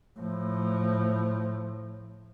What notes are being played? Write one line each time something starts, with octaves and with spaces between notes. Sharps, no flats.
A2 F3